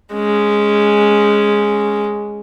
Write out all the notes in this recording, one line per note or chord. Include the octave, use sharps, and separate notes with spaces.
G#3 C#4